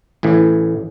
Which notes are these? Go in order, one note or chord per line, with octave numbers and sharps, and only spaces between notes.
A1 A2 E3